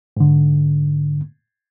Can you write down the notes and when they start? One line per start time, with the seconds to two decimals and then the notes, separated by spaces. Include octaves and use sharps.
0.17 G#2 D3